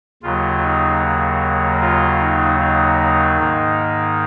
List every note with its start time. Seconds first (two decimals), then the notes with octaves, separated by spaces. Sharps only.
0.23 D#2 C#3 F#3 A#3 F4
0.62 D#4
1.81 F4
2.20 D#4
2.60 D#4
3.39 G#2 D#3 A#3